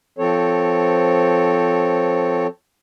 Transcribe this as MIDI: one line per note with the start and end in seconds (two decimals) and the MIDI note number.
0.19 2.47 53
0.19 2.47 60
0.19 2.47 69
0.19 2.47 73